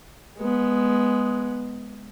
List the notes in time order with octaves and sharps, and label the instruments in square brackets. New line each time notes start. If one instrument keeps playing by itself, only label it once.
[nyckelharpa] G#3 B3